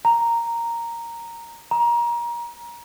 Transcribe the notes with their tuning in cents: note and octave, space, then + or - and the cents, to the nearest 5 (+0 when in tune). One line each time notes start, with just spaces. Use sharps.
A#5 -5
A#5 +25